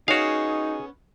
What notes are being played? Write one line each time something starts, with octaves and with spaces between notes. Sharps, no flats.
B3 C#4 D#4 F#4 G#4 C#5 F5